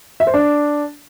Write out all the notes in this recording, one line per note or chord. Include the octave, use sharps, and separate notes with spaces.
E5
C5
D4